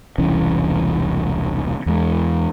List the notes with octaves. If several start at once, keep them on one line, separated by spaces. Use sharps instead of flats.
E1 C2 E3 C#4
E2 G#3